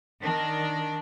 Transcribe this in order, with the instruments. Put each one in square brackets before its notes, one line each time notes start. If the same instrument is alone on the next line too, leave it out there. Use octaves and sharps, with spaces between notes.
[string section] D#3 D4